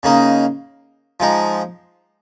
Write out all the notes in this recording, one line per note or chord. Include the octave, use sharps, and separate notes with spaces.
C#3 A#3 D#4
F3 G#3 D#4